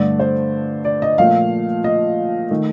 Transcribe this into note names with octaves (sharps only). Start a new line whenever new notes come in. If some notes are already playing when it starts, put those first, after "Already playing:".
Already playing: G2 D3 A3 D5
C5
D5
D#5
A#2 F3 A3 F5
D#5
D#3 A3